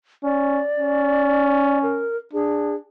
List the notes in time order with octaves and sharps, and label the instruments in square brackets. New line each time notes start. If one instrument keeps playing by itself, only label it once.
[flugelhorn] C#4 [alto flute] D5
[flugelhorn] C#4
[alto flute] A#4
[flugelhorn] D4 [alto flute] G#4